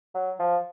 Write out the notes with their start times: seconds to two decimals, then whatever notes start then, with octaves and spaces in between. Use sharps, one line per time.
0.14 F#3
0.39 F3